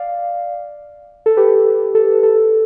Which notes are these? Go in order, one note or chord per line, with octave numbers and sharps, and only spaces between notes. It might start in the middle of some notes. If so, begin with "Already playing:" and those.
Already playing: D5 F5
A4
G4 B4
A4
A4